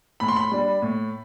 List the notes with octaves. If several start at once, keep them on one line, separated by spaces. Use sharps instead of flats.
A2 B5
C6
B5
G3 D4
A2